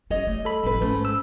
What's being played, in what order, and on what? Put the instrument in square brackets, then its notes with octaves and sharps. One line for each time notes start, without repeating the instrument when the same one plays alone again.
[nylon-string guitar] G3 C#5 D#5 [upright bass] C#4
[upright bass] A3
[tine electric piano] A4 B5
[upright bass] A1 F3 [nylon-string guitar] G3 B4
[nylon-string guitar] G#2 A3 [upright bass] C#4
[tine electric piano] E6